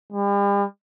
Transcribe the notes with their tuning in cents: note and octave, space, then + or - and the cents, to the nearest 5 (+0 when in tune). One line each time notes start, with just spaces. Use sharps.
G3 +40